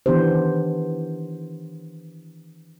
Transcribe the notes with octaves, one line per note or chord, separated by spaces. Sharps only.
D#3 E3 B3 D4 G4 C5